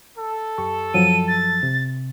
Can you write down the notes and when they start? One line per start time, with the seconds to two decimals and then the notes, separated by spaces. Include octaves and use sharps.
0.18 A4
0.58 F#2 G4 C#6
0.94 F#2 F3 F#3 D#7
1.28 A6
1.63 C3